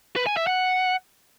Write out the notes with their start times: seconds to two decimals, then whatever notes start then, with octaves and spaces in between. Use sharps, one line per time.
0.16 B4
0.27 G#5
0.37 E5
0.47 F#5